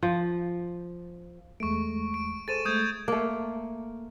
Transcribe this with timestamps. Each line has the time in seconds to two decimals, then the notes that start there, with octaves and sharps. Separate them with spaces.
0.03 F3
1.60 E2 G#3 A3 C#6 D7
2.14 D7
2.48 G#4 A4 C5 A6 D#7 E7
2.65 G#3 A3 D#6 G6 G#6
3.08 A3 A#3